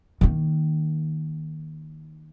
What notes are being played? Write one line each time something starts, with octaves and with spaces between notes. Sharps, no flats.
D#3 A#3